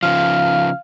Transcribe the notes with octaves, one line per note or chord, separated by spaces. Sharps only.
C#3 F3 F5